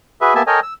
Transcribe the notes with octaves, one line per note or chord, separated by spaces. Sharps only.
F#4 G#4 B4 E5
A#3 B3 G4 E5 G#5 A5
A4 A#4 C#5 D#5 G5 G#5
E6